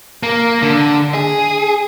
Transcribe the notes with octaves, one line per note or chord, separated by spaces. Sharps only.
A#3
D3
G#4